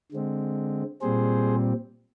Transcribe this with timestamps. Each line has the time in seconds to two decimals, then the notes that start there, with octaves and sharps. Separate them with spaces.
0.12 D3 G#3 C4
1.01 A#2 G3 C4 G#4 C5